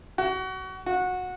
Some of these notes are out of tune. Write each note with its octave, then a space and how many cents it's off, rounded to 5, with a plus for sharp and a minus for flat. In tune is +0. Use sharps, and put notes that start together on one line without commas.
F#4 +25
F#4 -20